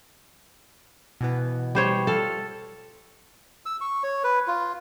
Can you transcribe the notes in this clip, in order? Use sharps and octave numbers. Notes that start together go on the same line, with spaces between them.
B2 E3 B3
G3 C5 C#5
F4 A4 F6
E6
C#6
C#5
B4
F4